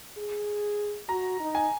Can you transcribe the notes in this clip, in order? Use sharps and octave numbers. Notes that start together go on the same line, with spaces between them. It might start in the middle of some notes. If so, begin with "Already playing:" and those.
G#4
F#4 A#5
D#4
G#5